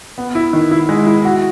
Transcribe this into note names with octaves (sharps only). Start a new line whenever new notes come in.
B3
E4
D#3
E4
G#3
E4
F#4